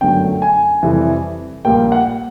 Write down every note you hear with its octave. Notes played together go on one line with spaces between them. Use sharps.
G1 F#2 D3 F#3 A3 G5
G#5
F2 C3 E3 G3
A#1 A#2 G3 A#3 G5
F#5